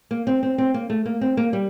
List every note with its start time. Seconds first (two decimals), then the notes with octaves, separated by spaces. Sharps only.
0.11 A#3
0.27 C4
0.43 C4
0.58 C4
0.74 A#3
0.90 A3
1.06 A#3
1.21 C4
1.37 A#3
1.53 G3